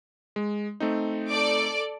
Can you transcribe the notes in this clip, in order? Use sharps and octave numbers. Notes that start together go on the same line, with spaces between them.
G#3
A3 C4 D#4
A4 D5 D6